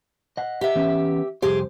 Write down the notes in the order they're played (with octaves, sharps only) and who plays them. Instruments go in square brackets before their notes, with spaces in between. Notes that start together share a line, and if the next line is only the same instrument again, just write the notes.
[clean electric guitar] D#5 F#5
[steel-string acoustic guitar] G4 E5
[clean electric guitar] E3 B3 C#4
[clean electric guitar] C2 F2 C5 [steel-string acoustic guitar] G4 G#4